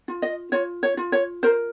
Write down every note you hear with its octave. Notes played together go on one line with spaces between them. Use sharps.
F4
D#5
F4 C#5
C#5
F4
C#5
A#4 C5